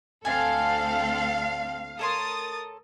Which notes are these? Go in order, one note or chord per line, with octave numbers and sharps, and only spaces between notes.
D2 C4 D4 A4 F5 G#5
A4 A#4 C#5 C6 D#6 A6